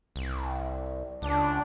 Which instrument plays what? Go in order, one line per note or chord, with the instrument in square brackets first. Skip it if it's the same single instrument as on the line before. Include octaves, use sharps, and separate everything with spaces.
[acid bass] C2
[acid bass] C#2 [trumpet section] D4